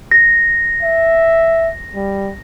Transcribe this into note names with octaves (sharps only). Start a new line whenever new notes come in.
A#6
E5
G3